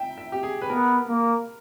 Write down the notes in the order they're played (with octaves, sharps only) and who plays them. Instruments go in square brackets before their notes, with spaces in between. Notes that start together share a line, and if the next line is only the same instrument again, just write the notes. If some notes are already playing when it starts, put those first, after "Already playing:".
Already playing: [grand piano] E5 G5
E5
G4
G#4
B4
[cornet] B3 [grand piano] A#4
[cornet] A#3